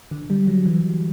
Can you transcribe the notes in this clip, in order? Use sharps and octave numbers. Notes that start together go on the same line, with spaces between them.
D3
G3
F#3
E3